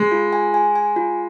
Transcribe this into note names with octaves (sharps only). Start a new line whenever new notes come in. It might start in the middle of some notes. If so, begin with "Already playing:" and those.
Already playing: G#3
F4
G#5
G#5
G#5
F4